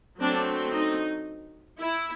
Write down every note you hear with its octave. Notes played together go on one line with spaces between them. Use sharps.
F#3 A3 C4 D4
D#4
E4